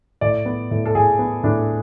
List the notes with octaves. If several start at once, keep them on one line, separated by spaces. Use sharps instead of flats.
A2 D5
B3
A2
A4
A2 G#4
B3
A2 D4